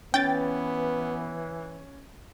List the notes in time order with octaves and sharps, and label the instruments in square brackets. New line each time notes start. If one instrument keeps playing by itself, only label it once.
[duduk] E3 [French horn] B3 [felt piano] C#4 [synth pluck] G5 A6